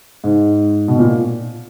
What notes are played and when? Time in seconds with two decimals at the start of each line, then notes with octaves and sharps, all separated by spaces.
0.24 G#2
0.88 B2
0.99 A#2